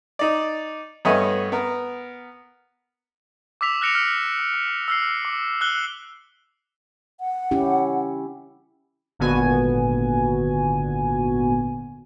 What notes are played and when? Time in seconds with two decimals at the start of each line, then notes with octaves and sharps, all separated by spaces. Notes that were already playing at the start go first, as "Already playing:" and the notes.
0.19 D#4 D5
1.05 G2 A3 B3 C#5 D#5 G#5
1.52 B3 A#4
3.61 D6 E6 B6 F7
3.81 F6 F#6 A#6 C#7 D7 F7
3.95 F6
4.88 E6 F6 C7
5.25 D6
5.61 E6 F#6 G7
7.20 F#5
7.51 C#4 E4 G4
9.19 G#1 A#2 D3 B3 F#4 G#5